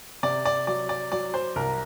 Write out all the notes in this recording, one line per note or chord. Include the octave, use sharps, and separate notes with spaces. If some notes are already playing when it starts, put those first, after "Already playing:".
C3 D5
D5
F#3 D5
D5
F#3 D5
C5
C2 A#4